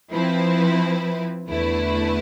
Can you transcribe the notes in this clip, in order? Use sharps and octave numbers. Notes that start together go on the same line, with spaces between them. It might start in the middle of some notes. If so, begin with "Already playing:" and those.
F3 C4 E4 B4
E2 D3 A3 E4 B4